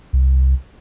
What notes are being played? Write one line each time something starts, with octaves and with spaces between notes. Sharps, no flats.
C2